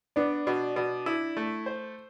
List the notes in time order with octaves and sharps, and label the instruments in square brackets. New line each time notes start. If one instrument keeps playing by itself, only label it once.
[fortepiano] B3 [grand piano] D4 D5
[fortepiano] B2
B2
E4
A3
C5